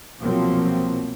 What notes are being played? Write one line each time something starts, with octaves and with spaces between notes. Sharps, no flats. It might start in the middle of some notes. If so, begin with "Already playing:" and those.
C2 B2 F3 F#3 A#3 C4